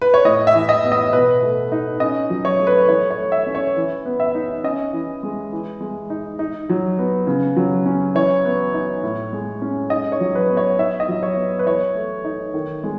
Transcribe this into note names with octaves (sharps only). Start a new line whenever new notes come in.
B4
C#5
A2 D#5
E5
E3
D#5
B3
D#5
B2 B4
A3
D#4
C#4 D#5
F#3
C#5
A3
B4
E3 C#5
C#5
A3
E5
C#4
C#5
E3
B3
E5
D#4
C#4 D#5
E3
G#3
E3
G#3
D#4
D#4
F#3
B3
C#3
F#3
C#4
E3 C#5
B3
D#4
A2
G#3
C#4
D#4 D#5
C#5
F#3
B4
B3
C#5
D#4 E5
D#5
F#3
C#5
B3
B4
E3 C#5
A3
D#4
D#3
G#3